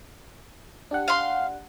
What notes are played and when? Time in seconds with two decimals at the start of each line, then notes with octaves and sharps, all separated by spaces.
0.91 D4 G4 F#5
1.08 F5 C6